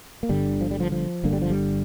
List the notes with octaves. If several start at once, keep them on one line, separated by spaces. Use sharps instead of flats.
A#3
G1 G2 D3 G3
F3
G3
F3
F3
G1 G2 D3 A#3
G3
F3
G3